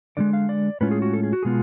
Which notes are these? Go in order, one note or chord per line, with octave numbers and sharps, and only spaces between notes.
D3 F3 G#3 D5
F5
D5
A2 G#3 C#4 F4 B4
G#4
F#4
A4
G#4
F#4
B2 G#3 B3 F4 G#4